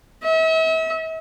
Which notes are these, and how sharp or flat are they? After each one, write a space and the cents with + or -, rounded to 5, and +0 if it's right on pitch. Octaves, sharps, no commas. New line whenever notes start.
E5 -40